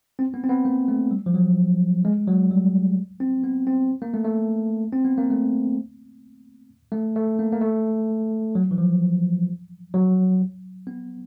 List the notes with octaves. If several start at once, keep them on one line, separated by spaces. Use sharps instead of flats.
C4
B3
C4
B3
A#3
A3
G3
F3
F#3
G#3
F#3
G3
C4
B3
C4
A#3
A3
A3
C4
B3
A#3
A3
A3
A3
A#3
A#3
A3
F#3
E3
F3
F#3
B3